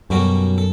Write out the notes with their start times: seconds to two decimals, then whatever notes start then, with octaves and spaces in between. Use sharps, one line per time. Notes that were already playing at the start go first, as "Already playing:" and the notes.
0.10 F#2 B2 G3 C#4 F#4 A4
0.58 A4